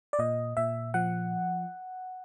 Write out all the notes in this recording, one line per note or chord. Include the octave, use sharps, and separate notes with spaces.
D5
A#2 D#5
A#2 E5
F3 F#5